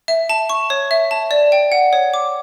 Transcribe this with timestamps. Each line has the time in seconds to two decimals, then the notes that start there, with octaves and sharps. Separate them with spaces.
0.08 E5
0.29 A5
0.49 C#6
0.70 C#5
0.91 E5
1.11 A5
1.31 D5
1.52 G5
1.72 F#5
1.93 C#5
2.14 D6